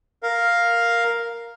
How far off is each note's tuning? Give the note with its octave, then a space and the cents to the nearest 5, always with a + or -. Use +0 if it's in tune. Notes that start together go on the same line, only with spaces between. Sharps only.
A#4 +0 F5 +0